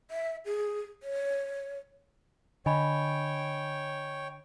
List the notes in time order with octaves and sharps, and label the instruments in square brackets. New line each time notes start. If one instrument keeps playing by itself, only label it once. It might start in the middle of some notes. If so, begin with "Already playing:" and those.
[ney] E5
G#4
C#5
[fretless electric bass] D3 [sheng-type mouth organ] C#5 G5 [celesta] D#5 G#5 B5